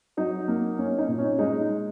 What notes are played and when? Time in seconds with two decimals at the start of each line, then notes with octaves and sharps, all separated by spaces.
0.17 F#3 D#4
0.48 A#3
0.79 A#3 C#4
0.98 D#4
1.08 A#2
1.18 C#4
1.39 G#3 D#4